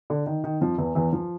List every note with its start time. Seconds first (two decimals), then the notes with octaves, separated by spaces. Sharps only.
0.10 D3
0.27 D#3
0.44 D#3
0.61 F2 F3
0.78 E2 E3
0.95 E2 E3
1.13 F3